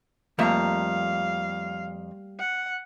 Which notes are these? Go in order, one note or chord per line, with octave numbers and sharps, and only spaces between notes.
F2 G3 A3 A#3 F5 A#5
F#5